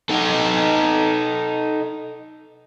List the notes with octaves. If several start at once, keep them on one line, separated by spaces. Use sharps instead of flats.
D#4 A4